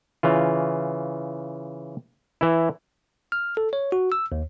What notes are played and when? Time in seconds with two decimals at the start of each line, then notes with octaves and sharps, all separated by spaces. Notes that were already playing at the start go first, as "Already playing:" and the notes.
0.23 C#3 E3 F4
2.41 E3 E4
3.32 F6
3.57 A4
3.73 C#5
3.92 F#4
4.12 E6
4.32 D#2